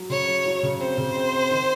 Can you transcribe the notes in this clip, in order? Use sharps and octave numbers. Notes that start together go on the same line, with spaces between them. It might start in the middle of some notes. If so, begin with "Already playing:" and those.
Already playing: F#3
C#3 C#5
F#3
F#3
C#3
C4 C5
C#3
C4
C4
D#3